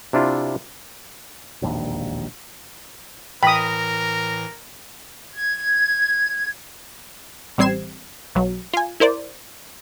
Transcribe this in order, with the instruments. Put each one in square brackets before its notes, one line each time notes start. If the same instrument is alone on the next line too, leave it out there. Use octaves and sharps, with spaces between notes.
[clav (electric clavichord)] C3 D4 E4 F4
[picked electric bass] E1 A#1 D#2
[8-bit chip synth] A2 E3 A#6 [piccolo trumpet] A#4 [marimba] G5 [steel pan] B5 D#6
[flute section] G#6
[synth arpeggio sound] A1 G3 C4 G#6 C7 E7
B1 F#3
F4 G#5
E4 A#4 C5 D5